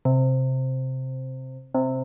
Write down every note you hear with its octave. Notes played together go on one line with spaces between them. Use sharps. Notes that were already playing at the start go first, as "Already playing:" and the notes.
C3
C3